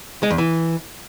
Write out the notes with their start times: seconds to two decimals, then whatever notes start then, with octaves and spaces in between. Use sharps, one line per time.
0.23 G#3
0.31 E2
0.38 E3